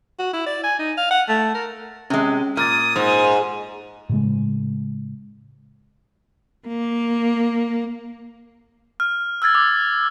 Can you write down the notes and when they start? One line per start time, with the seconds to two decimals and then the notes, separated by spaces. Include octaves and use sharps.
0.19 F#4
0.33 E4
0.46 D5
0.64 G#5
0.79 D#4
0.97 F5
1.11 F#5
1.28 A3
1.55 A#4
2.10 C3 G#3 C#4
2.57 A#2 D#6 F6 G#6 A6
2.96 G#2
4.09 A2 C#3 G#3
6.67 A#3
9.00 F6
9.42 E6 F6 G#6 A6
9.55 D6